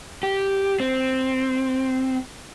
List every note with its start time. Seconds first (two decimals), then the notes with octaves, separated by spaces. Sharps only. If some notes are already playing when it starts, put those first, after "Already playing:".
0.23 G4
0.80 C4